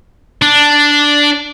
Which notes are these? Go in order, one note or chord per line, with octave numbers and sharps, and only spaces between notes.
D4